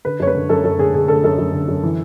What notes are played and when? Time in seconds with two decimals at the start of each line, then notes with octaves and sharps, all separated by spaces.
0.05 D3 B4
0.20 F#2 C#5
0.27 B4
0.35 D3
0.49 F#2 A4
0.64 F#2 A4
0.78 D3 G#4
0.93 D3 G#4
1.08 D3 A4
1.24 F#2 A4
1.38 F#2
1.53 D3
1.68 F#2
1.83 E3